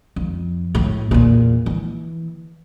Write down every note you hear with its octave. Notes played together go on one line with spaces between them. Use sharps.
F2
A2
E2 A#2
E3